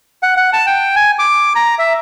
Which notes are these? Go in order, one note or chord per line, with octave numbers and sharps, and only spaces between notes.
F#5
F#5
A5
G5
G#5
D6
A#5
E5